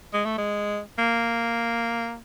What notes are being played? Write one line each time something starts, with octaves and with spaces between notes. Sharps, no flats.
G#3
A3
G#3
A#3